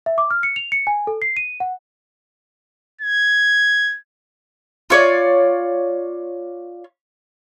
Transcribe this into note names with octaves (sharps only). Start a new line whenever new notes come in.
E5
D6
F6
C#7
F7
C#7
G#5
A4
C7
D#7
F#5
G#6
F4 C#5 D5